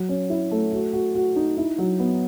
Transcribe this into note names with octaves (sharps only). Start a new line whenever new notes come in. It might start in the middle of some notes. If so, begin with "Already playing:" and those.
Already playing: F#3
C#4
E4
A3
F#4
F#4
F#4
D#4
E4
F#3
B3